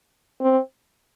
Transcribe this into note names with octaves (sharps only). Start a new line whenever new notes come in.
C4